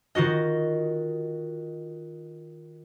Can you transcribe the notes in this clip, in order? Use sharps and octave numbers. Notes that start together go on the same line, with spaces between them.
D#3 F4 F#4 D#5